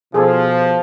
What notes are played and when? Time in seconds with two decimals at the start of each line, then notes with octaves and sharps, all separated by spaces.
0.14 B2 F3 G#4 A4